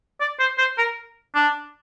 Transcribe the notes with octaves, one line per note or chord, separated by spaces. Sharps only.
D5
C5
C5
A#4
D4